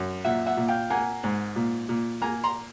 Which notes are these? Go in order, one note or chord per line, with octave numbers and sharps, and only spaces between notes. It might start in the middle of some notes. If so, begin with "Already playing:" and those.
Already playing: F#2
A#2 E5 F#5
E5 F#5
A#2
F5 G5
A#3 F#5 G#5
G#2
A#2
A#2
A#3 G#5 A#5
A#5 C6